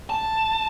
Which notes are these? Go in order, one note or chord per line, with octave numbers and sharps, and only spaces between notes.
A5